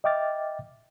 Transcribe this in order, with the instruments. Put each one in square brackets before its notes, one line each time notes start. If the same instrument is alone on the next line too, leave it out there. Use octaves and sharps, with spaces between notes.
[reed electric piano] D#5 E5 G5 D6 F6 A6